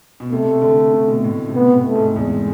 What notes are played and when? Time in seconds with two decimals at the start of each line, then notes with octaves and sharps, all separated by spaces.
0.20 B2
0.32 C3 A3
0.62 D3
0.93 D3
1.08 B2
1.24 A2
1.49 C3
1.54 B3
1.62 B2
1.74 A2
1.84 A3
1.95 G#2
2.16 E2 G#3